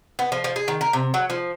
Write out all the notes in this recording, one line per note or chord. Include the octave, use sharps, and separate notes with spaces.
B3
F3
F3
G#4
D#3
A#4
C3
F#3
F3